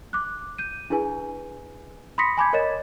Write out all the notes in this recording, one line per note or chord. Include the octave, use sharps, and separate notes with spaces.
D6 F#6
G6 D#7
D4 E4 G#4 B4 G#5
B5 C6 D#6 A#6 B6 C#7
G#5 A5 B5 D6 G6 G#6
A#4 C#5 D#5 B5 A6 E7